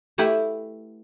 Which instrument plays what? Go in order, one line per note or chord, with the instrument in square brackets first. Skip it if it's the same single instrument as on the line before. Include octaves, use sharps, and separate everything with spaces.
[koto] A3 E4 G4 B4 E5 F#5